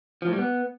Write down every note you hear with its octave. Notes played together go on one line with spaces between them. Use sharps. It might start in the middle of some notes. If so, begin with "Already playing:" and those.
F3
A2
G3
B3